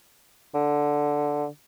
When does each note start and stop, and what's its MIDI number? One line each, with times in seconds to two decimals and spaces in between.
0.54 1.47 50